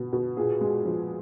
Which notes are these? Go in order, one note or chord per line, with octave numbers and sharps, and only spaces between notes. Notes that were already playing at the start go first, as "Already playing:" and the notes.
Already playing: B2
B2
A#2 G#4
G#3
F3